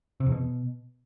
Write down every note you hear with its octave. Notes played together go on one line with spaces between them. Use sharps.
C3
E2
B2